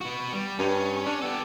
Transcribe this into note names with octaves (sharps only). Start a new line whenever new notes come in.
B3 F#4
G3
G2 C#4
C#4 D4
B3 G4 A4